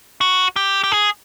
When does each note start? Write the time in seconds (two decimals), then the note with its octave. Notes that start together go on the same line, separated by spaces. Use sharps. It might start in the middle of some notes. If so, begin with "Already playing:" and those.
0.21 F#4
0.56 G4
0.84 G4
0.92 G#4